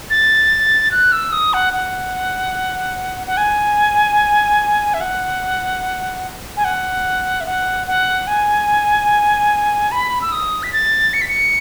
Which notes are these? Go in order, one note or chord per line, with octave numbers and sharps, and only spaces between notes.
A6
F#6
E6
D#6
F#5
F#5
F#5
G#5
E5
F#5
G#5
F#5
E5
F#5
F#5
G#5
B5
E6
D#6
B6
A6
C#7
B6
C#7